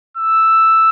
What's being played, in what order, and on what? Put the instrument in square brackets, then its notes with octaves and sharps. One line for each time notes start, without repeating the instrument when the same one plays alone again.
[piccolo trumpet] E6